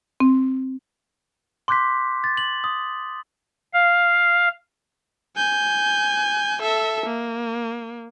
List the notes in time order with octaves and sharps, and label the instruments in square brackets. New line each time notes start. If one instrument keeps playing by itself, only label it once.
[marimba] C4
[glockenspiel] C6 D6 F#6 G6 B6
A6
F#7
D#6
[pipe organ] F5
[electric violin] G#5 G6
A4 E5
A#3